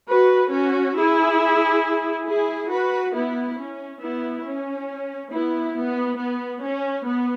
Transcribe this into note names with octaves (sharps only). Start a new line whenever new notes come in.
F#4 B4
C#4 F#4
E4 G#4
E4 G#4
F#4 B4
B3 E4
C#4
B3 E4
C#4
B3 E4
B3
B3
C#4
B3